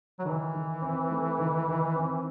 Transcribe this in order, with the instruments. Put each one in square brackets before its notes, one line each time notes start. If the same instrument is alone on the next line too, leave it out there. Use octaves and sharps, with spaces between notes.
[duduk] F#3
[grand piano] D#3 [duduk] E3
[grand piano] D#3
C4
A3
D#3
D#3
C4